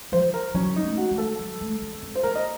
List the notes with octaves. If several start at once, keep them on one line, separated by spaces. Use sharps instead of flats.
F3 C5
A#4
F#3 C#4
D#4
A3
F#4
A3
A4
F#3
A3
A#3
C4
C5
A#3 A#4
D#5